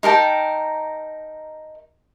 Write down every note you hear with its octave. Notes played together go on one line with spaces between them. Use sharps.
D#4 A#4 G5 A5